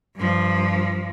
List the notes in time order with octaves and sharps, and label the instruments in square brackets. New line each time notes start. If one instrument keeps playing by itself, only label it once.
[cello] G2 F3